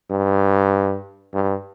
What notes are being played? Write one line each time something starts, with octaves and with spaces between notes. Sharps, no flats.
G2
G2